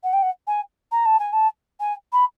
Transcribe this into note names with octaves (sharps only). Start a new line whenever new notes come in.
F#5
G5
F#5
G#5
A#5
A5
G#5
A5
G#5
B5